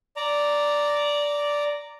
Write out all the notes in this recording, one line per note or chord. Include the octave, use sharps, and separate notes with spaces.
D5 A#5